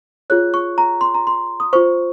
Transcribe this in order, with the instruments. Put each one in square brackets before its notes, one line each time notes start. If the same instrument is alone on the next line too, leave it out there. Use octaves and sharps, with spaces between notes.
[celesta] F4 G#4 C#5 F#6
C#6
A#5
C6
A#5
C6
D#6
F4 C5 C#6